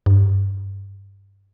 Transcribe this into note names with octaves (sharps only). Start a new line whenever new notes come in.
G2